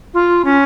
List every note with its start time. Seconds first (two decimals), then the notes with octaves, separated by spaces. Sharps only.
0.14 F4
0.45 C#4